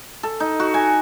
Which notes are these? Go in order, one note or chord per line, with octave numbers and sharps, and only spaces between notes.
A4
D#4
F#4
G#5